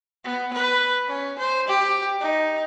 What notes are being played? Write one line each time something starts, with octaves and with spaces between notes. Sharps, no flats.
B3
B4
C#4
C5
G4
D#4